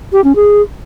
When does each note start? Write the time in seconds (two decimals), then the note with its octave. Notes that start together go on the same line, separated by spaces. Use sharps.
0.13 G4
0.24 C#4
0.36 G#4